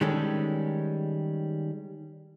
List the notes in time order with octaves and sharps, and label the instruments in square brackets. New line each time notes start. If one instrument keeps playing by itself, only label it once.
[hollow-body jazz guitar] D#3 G3 G#3 C#4 A4